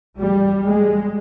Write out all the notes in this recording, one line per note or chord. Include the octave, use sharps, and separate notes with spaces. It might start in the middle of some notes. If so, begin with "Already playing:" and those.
G3
G#3